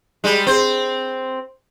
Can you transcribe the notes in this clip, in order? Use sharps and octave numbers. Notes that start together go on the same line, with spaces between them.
G3 G#3
C4 C5